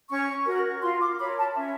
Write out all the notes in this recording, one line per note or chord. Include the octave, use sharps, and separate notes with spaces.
C#4 C#6
F#4 A#4
F4 C6
D6
A#4 C#5 B5
A5
C#4 E5